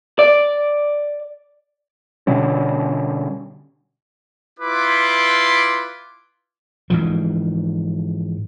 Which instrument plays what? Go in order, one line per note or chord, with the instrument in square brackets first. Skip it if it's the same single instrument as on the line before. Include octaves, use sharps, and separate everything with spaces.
[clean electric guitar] D5
[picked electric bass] B2 D3 G3 C#4
[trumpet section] E4 F4 B4 C6 D6
[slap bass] G#2 E3 F3